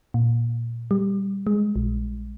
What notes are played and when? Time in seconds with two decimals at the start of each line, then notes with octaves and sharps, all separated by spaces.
0.14 A#2
0.91 G3
1.47 G#3
1.76 A#1